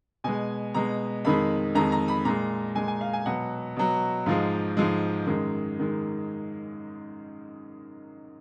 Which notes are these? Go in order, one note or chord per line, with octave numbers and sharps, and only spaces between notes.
B2 G#3 G#5
B2 G#3 A#5
F2 D#3 G#3 B5
F2 D#3 G#3 A#5
A#5
B5
A#2 G#3 A#5
A#2 G#3 G#5
G#5
F5
G#5
B2 F#3 F#5
B2 F#3
G#2 F3 G#3 F5
G#2 F3 G#3
F#2 D#3 G#3
D#3 G#3